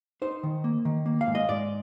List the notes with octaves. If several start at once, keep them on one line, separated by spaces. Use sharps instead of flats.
D#4 C5
D#3
A#3
D#3
A#3
F5
G#2
D#5
G#2 D5